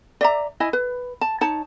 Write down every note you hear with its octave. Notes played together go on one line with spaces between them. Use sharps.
D5 E5 A#5
E4 D#5 G#5
B4
A5
D#4 C#5 A5